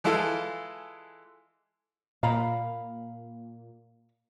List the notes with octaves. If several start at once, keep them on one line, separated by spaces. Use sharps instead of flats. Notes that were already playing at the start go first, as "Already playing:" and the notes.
E3 G#3 E4 F4 A4
A#2 F5 A#5 B5